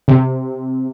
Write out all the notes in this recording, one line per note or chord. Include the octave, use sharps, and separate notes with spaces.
C3